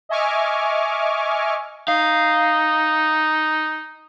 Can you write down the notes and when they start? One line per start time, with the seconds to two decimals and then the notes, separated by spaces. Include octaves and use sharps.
0.09 D#5 E5 G#5 C#6 D6 F6
1.88 D#4 F5